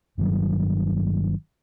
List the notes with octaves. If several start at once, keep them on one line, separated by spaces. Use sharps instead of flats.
G1 G2 D#3 F#3